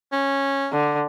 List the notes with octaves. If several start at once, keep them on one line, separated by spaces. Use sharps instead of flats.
C#4
D3